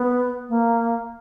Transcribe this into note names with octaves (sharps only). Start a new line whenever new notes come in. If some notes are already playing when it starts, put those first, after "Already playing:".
Already playing: B3
A#3